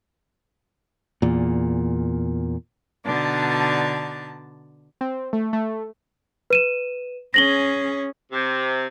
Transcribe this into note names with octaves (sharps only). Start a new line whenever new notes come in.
E2 A#2
B2 D3 D4 D#4 A5
C4
A3
A3
B4 D#7 E7
C#4 G#4 A#6 F#7 G7
C3